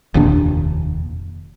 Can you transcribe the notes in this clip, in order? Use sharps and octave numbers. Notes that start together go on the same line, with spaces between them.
F1 D#2 A#2 D4